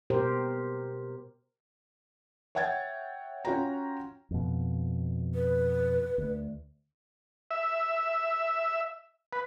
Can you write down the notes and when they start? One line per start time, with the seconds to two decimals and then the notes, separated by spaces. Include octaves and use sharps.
0.10 B2 G4 A#4 C5
2.55 C#5 E5 F#5 G5 G#6 A6
3.45 C#4 F4 F#4 C#5 G5 A#5
4.31 F2 B2
5.35 B4
6.18 D2
7.51 E5
9.33 B4